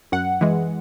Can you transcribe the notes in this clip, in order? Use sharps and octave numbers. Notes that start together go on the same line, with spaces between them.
F#2 F#5
E3 G#3